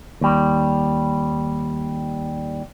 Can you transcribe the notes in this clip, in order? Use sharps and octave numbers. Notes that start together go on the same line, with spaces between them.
D#2 G3